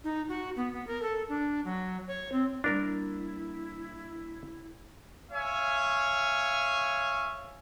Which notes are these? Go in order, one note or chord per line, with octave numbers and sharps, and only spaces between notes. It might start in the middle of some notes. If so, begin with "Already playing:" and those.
D#4
F#4
B3
B3
A#4
A4
D4
F#3
C#5
C4
G3 A#3 D4 E4 A#4
C#5 E5 F5 G#5